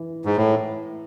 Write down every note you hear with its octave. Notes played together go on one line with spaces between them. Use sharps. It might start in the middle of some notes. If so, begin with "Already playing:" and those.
Already playing: E3
G#2
A2